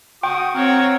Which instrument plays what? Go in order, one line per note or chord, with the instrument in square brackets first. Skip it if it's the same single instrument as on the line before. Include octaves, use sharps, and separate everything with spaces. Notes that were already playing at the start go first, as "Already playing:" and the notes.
[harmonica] F#4 C#6 D#6 [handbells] G5
[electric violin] C4 C#5 [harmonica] F5 F#5 A#5